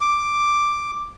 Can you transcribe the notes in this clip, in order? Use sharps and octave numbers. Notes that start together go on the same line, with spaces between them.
D6